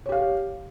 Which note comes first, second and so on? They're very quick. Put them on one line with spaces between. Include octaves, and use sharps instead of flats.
C#5 G4 F5